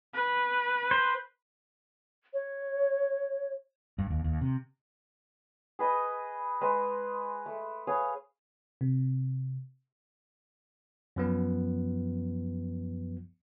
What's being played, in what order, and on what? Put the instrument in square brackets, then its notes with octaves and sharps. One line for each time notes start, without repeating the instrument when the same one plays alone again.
[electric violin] B4
[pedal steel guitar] C5
[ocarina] C#5
[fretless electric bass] G2
D#2
D#2
C3
[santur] G#4 B4 D#5
G#3 B4 C5
A3
G#4 B4 C#5 F5
[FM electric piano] C3
[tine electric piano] F#2 F3 B3